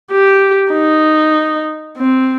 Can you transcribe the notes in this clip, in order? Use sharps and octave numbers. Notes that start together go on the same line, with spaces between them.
G4
D#4
C4